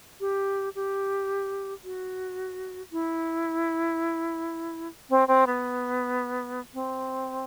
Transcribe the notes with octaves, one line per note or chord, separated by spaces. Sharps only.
G4
G4
F#4
E4
C4
C4
B3
C4